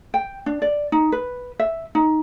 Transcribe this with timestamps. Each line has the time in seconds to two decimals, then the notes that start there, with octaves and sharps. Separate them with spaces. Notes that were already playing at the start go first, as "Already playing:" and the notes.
0.14 G5
0.46 D4
0.62 D5
0.92 D#4
1.12 B4
1.59 E5
1.95 D#4